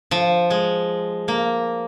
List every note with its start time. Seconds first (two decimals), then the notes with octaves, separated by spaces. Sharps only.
0.11 F3
0.50 G#3
1.28 A#3